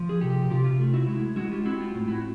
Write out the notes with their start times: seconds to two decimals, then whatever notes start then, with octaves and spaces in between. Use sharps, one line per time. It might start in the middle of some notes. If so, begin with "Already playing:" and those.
Already playing: F3
0.09 G#4
0.21 C3 G4 A4
0.50 C3 F4 G4
0.64 F4
0.79 A3
0.94 E4 F#4
1.07 G#3 E4
1.36 G#3 E4 F#4
1.51 F4 G4
1.65 C4 E4 F#4
1.80 F4
1.95 A2
2.08 E4 F#4